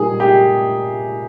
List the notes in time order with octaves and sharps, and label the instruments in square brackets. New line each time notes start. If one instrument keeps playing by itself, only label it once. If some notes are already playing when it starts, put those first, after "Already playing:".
Already playing: [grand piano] A#2 G3 A#3 D#4 [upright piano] G#4
[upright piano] G4